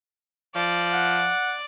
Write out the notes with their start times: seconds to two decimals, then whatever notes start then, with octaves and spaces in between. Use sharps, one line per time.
0.55 F3 D5
0.93 F#5